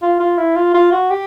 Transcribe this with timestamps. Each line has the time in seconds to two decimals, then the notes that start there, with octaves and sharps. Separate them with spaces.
0.02 F4
0.20 F4
0.38 E4
0.56 F4
0.74 F4
0.92 F#4
1.10 G4